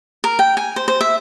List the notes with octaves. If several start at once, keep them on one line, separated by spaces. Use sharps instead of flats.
A#4
G5
G#5
C5
C5
E5